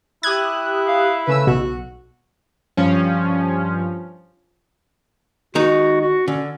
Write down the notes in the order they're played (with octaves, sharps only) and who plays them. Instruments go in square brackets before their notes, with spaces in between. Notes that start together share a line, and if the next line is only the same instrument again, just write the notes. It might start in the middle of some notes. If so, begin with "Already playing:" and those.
[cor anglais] E4 [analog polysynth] G4 D#6 F#6 [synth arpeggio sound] G#6
[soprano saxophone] F5
[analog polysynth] C#3 A3 E6 [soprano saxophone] B4
[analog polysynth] B1 [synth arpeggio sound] B2 [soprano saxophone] F#4
[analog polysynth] G2 F3 C#4
[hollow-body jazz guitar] D#3 G#3 D#4 [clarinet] F#4
[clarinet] F#4
[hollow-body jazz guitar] D3 [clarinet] C#4